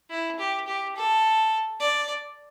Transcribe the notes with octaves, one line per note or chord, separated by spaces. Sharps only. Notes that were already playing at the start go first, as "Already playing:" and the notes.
E4
G4
G4
A4
D5